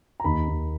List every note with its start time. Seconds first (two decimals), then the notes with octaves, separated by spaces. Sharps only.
0.20 A#5
0.24 D#2 B5
0.48 D#2